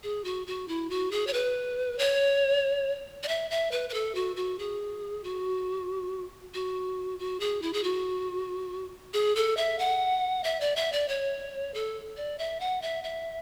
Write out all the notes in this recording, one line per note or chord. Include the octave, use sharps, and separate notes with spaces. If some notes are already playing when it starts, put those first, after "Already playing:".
G#4
F#4
F#4
E4
F#4
G#4
C#5
B4
C#5
D5
E5
E5
B4
B4
A4
F#4
F#4
G#4
F#4
F#4
F#4
G#4
E4
G#4
F#4
G#4
A4
E5
F#5
E5
D5
E5
D5
C#5
A4
D5
E5
F#5
E5
E5